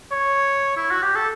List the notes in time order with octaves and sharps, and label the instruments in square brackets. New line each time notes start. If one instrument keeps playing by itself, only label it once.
[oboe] C#5
E4
F#4
G4
A4